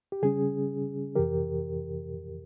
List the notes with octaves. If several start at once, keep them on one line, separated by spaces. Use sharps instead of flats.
G4
C#3 G3 C#4 G#4
F2 C3 E3 G4 A#4